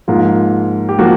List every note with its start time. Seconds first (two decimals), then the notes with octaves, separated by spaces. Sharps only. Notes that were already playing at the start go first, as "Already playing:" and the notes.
0.08 G#2 F3 A#3 F4
0.89 G4
0.99 F3 A#3 F#4